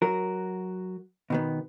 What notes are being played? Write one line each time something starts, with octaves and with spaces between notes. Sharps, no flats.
F#3 F#4 A#4
B2 D#3 B3